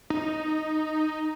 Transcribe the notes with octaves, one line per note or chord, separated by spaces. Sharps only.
D#4